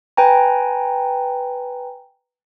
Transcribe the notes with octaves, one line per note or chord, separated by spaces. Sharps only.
B4 G5 G#5 A#5